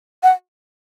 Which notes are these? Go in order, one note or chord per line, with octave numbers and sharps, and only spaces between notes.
F#5